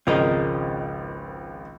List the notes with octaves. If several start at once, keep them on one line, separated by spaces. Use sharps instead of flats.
G#1 C#2 F3 C4 C#4 G#4 A#4 D#5